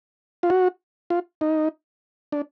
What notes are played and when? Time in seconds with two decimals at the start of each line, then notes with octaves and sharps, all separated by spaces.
0.43 F4
0.50 F#4
1.10 F4
1.41 D#4
2.32 D4